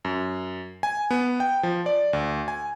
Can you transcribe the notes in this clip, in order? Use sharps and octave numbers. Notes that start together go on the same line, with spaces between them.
F#2
G#5
B3
G5
F3
D5
D2
G#5